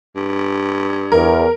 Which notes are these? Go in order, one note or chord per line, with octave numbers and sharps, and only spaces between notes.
G2
E2 A#4